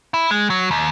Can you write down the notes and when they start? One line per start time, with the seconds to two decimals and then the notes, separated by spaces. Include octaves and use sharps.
0.14 E4
0.31 G#3
0.50 F#3
0.71 D#2